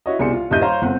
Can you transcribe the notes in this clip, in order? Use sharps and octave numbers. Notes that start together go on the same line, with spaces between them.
E4 F#4 C#5 D#5
C2 B2 G#4 C5 D5 C#7
F4
D#1 G2 E4 D#5 G6 D#7
C5 C#5 F5 A#5 C6
G1 C4 F#5